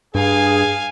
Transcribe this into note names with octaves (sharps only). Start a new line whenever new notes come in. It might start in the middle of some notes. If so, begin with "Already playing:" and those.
G2 G#4 F5 G#5